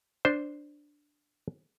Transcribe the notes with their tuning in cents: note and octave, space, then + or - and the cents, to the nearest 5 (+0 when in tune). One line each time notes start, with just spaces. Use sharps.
D4 +0 C5 +0